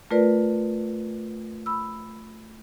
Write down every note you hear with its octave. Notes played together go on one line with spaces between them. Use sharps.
A3 F4 A#4 B4 D5
B5 E6